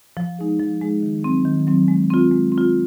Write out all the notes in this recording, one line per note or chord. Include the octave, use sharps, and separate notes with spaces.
F3
G#3 D#4 G#4
F3
G#3 D#4 G#4
D#3
F#3 C4
D#3
F#3 C4
G#3
C4 F4
G#3
C4
F4